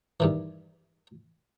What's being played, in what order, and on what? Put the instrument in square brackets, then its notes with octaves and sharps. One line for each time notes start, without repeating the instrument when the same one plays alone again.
[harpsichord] G2 D#3 E3